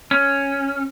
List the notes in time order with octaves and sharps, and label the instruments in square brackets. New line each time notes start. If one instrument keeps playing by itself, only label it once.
[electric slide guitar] C#4